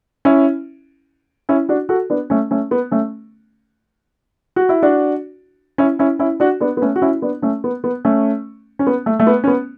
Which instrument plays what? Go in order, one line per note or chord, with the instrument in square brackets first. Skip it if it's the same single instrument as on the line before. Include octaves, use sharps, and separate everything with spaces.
[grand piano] C#4 E4
C#4 E4
D4 F#4
F#4 A4
B3 D4
A3 C#4
A3 C#4
B3
A3 C#4
F#4
E4
D4 F#4
C#4 E4
C#4 E4
C#4 E4
D4 F#4
B3 D4
B3
A3 C#4
F#4
C#4 E4
B3 D4
A3 C#4
B3
B3
A3 C#4
C#4
B3
A3
A3
B3
C#4
B3